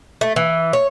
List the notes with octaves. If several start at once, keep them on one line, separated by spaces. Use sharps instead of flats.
A3
E3
C#5